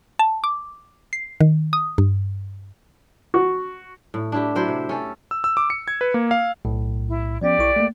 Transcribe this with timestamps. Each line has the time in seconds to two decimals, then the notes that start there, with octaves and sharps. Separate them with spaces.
0.19 A5
0.44 D6
1.13 C7
1.41 D#3
1.73 D#6
1.98 G2
3.34 F#4
4.14 A2
4.32 D4 E4 G4
4.55 F#3 E4 G4 C5
4.68 C3
4.89 C#4 A4
5.31 E6
5.44 E6
5.57 D6
5.70 C#7
5.88 G#6
6.01 B4
6.14 A#3
6.31 F5
6.65 B1 A2
7.08 E4
7.41 F3 B3 C#4 G4 D5
7.60 B1 E4 C#6
7.76 A3 A#3